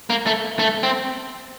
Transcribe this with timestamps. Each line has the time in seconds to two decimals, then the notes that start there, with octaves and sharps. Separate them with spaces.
0.10 A#3
0.26 A3
0.59 A3
0.83 C4